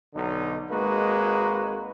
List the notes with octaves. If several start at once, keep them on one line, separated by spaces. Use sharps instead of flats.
B1 D3 D#4
G#1 G#3 A#3 D#4 F#4 B4